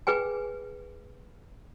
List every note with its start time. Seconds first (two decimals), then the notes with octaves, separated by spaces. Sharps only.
0.07 G#4 B4 G5 G#5